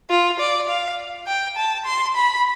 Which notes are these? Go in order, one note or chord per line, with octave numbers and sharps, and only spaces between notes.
F4
D5
F5
G5
A5
C6
B5